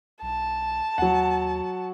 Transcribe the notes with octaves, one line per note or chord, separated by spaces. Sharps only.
B1 A5
D#2 F#3 F#5